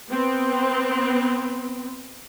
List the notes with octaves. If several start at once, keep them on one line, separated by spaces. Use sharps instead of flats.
B3 C4